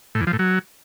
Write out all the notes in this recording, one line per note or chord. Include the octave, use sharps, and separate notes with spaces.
A2
E2
F3
A2
F#3